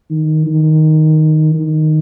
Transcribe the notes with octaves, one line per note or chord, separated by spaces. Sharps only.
D#3
D#3
D#3